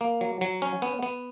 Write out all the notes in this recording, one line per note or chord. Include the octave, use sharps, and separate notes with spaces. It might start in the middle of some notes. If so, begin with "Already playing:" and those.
A#3
F#3
F#3
C#4
B3
B3